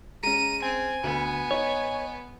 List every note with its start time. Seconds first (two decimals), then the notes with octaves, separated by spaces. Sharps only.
0.23 G#3 C#4 A#5 D#7
0.63 C4 G#5
1.04 D2 B3
1.51 D#4 C#5